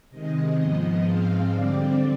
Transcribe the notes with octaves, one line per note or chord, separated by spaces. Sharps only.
C3 D#3 G#3 D#5
G#2 F3 G#3 B3
G#2 F3 G#3 C4 F5
D3 G3 C4 D5